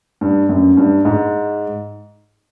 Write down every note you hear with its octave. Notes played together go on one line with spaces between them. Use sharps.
G2
F#2
G2
G#2